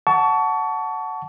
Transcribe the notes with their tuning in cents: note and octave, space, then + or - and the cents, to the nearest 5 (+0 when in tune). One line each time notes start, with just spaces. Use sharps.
F#5 +0 A5 +0 C#6 +30